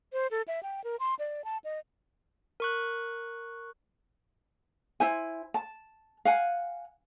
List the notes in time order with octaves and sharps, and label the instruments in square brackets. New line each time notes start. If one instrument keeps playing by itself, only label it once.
[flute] C5
A4
E5
G5
A#4
C6
D5
A5
D#5
[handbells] A#4 C#6 F#6
[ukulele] E4 C5 G#5
A5
F5 F#5 G#5